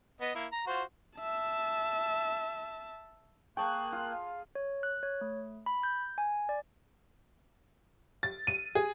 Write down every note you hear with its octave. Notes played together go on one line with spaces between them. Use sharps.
B3 D#5
A#3 E4
A#5
F4 F#4 C5
E5 A5
A#3 G#4 G5 A5 C#6 F#6
F4
F5
C#5
F#6
C#5
A3
B5
G6
G#5
D5
A6
D#7
G#4